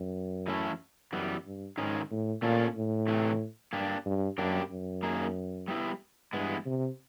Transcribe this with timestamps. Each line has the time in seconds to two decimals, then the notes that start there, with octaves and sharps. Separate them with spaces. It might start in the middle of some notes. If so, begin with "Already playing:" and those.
Already playing: F#2
0.48 E3 A3 C#4 E4 A4
1.13 F#2 E3 G3 B3
1.46 G2
1.77 G#2 D#3 G#3 C#4
2.10 A2
2.42 A#2 A3 C#4 F4 A4
2.75 A2
3.08 C3 E3 A3
3.72 G2 A#3 D4 G4
4.06 G2
4.38 F#2 G3 A#3 D4 G4
4.70 F#2
5.03 A#3 D#4 G#4
5.68 G3 B3 E4
6.33 G2 E3 G#3 B3
6.65 C3